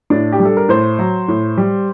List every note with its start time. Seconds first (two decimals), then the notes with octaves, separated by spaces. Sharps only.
0.10 A2 D4
0.32 G4
0.39 G3
0.45 A4
0.57 A#4
0.69 A2 C5
0.99 F#3
1.28 A2
1.58 G3